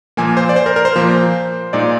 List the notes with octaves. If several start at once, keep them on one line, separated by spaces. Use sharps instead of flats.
A#2 F3 A#3 G#5
C5
D5
C5
A#4
A#4
C5
A#2 F3 A#3
A#2 G#3 D#4 D5